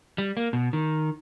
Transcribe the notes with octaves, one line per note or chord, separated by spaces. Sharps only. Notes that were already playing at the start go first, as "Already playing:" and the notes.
G3
A#3
B2
D#3